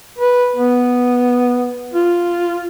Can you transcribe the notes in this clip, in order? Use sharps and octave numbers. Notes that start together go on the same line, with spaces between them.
B4
B3
F4